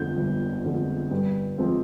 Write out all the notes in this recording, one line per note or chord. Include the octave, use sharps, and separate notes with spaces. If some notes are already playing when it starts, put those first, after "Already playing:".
Already playing: G1 F2 D3 G#3 G6
G1
F2 D3 G#3
G2
F3 G#3 C4